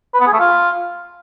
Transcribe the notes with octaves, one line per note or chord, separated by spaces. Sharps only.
B4
B3
G#4
A3
F4